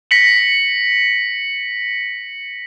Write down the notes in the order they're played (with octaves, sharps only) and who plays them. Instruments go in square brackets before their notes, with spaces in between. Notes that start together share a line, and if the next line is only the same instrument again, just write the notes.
[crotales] A#6 B6 C#7 F#7